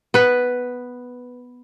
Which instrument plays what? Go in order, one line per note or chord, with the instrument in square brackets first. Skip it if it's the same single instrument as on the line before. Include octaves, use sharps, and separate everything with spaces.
[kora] B3 B4